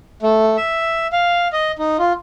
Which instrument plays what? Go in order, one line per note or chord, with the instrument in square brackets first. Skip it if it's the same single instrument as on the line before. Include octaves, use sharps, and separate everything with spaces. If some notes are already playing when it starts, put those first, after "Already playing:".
[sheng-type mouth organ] A3
E5
F5
D#5
D#4
F4